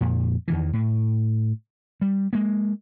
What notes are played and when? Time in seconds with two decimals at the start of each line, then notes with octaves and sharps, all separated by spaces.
0.01 F2 A#2
0.48 E2 D#3 E3
0.73 A2
2.02 G3
2.33 G#3 A#3